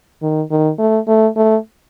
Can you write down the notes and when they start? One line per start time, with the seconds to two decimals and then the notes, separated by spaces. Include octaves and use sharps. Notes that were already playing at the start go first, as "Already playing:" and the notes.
0.22 D#3
0.51 D#3
0.79 A3
1.08 A3
1.36 A3